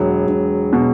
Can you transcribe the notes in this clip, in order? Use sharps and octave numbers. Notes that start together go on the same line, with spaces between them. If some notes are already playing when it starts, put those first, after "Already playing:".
Already playing: E1 F#3
E1
B2